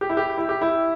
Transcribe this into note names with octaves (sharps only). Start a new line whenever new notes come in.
G4
E4
G4
E4
G4
E4